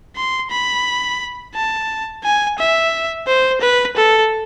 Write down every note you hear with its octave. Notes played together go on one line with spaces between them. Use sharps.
C6
B5
A5
G#5
E5
C5
B4
A4